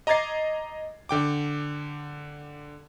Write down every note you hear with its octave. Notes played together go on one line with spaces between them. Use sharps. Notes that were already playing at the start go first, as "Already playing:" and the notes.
D#5 A#5 D6 G#6 A6 C7
D3 G5 D6